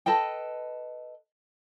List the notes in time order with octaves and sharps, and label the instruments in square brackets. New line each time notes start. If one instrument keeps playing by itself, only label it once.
[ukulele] A4 B4 D#5 G5